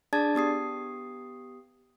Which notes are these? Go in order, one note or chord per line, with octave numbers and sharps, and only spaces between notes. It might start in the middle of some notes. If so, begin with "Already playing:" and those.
D4 G#4 D5 A5 G#6 A6
B3 G4 D#6 C7